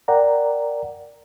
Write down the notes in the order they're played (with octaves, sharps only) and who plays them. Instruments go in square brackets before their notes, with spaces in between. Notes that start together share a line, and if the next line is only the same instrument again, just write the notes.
[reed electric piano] A#4 D5 F#5 G5 A#5